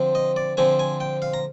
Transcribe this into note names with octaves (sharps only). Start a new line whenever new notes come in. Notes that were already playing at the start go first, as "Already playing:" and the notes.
Already playing: D3 F3 C4
D#5
D5
D3 F3 C4 G#5
G#5
G5
F5
A#5